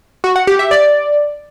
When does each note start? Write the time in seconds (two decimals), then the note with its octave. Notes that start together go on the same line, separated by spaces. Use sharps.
0.24 F#4
0.36 F#5
0.47 G4
0.59 E5
0.71 D5